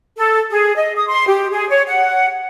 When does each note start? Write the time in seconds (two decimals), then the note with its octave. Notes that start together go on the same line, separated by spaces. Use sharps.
0.16 A4
0.51 G#4
0.76 D#5
0.96 D#6
1.08 C6
1.27 G4
1.52 G#4
1.70 C#5
1.88 F#5